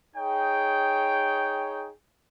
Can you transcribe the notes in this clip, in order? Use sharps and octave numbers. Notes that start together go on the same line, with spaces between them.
D#4 G#4 C#5 G5